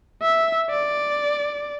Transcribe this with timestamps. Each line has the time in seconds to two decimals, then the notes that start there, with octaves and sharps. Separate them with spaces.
0.22 E5
0.70 D5